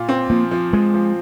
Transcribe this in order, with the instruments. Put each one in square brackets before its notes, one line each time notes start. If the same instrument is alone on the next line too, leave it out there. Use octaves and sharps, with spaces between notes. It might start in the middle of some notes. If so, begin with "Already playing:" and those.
Already playing: [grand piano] A#2 F4
C4
[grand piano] F3 [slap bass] A#3
[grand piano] F3
[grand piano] F3 [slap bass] G#3
[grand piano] F3